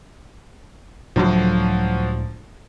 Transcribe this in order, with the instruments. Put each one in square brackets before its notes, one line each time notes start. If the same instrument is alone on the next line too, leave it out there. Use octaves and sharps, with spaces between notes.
[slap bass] C#2 A2 D4 [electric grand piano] F3 F#3